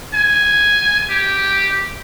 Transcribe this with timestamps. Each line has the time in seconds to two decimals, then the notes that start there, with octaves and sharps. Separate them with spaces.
0.14 G#5
1.09 G4